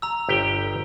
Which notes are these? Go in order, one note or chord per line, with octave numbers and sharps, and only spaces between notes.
A#5 E6
G1 G4 G5